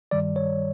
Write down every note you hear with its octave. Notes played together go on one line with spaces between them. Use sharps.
G2 D#3 G3 D5
C#5